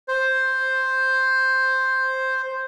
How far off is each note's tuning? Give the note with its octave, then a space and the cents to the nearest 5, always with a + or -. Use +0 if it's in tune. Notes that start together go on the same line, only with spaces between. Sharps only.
C5 +5